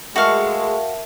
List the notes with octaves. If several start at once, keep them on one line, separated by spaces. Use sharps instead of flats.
G#3 A3 F#4 A#4 E5 F5 A5 C#6